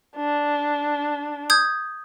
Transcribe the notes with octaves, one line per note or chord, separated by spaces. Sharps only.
D4
D#6 G6 G#6